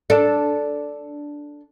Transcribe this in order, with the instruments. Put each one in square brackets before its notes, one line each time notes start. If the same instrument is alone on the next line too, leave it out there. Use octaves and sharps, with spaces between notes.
[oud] D4 A4